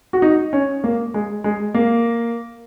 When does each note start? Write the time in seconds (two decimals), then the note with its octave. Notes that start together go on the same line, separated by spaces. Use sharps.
0.13 F#4
0.22 D#4
0.53 C#4
0.84 A#3
1.14 G#3
1.44 G#3
1.74 A#3